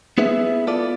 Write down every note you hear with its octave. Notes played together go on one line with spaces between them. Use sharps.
B3 E4 G#4 B4 E5
B3 F4 A4 D5